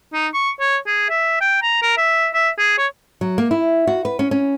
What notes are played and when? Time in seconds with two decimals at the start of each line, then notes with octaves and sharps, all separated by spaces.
0.13 D#4
0.34 C#6
0.60 C#5
0.87 G#4
1.10 E5
1.41 G5
1.62 A#5
1.82 A#4
1.97 E5
2.34 E5
2.58 G#4
2.78 C#5
3.21 F#3
3.38 A#3
3.51 E4
3.87 F#4
4.05 B4
4.19 C#4
4.31 C#4